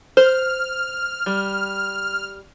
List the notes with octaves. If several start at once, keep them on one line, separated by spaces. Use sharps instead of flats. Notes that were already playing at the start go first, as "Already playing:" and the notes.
C5 F6
G3